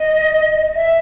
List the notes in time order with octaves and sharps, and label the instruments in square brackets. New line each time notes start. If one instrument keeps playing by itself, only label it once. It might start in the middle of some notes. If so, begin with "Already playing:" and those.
Already playing: [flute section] D#5
E5